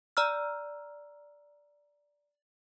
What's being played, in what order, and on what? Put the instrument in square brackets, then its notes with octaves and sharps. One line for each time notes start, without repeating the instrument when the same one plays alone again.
[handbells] D5 A#5 E6 F6